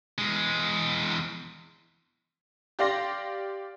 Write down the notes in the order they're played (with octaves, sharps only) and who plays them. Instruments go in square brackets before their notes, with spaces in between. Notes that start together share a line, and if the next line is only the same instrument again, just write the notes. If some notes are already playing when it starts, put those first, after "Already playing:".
[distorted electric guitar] E2 G#3
[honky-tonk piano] G4 D5 F5 C6 A#6